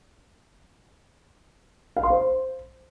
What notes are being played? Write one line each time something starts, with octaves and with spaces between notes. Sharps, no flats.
F5
C6
C5